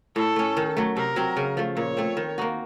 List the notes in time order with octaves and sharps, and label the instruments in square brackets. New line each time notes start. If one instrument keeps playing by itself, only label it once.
[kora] A2 [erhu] A4
[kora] A3 C#4
D#3
F#3 A3
[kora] C3 [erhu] A#4
[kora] F#3 C4
C#3
F3 A3
[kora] A#2 [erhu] C#5
[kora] A3 C4
D#3
A#3 D#4 F#4